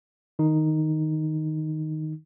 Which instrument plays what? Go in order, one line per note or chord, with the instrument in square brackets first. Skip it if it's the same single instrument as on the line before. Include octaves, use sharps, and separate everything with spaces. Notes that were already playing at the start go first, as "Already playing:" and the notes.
[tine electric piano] D#3 D#4